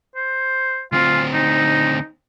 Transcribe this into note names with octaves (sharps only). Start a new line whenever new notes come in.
C5
D2 C4 F4
D#4